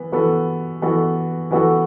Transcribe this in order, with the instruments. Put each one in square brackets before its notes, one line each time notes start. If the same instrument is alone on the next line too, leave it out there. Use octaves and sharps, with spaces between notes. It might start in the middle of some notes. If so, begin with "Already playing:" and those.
Already playing: [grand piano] E3 B3
E3 B3 F#4 A4
E3 B3 F#4 A4
E3 B3 F#4 A4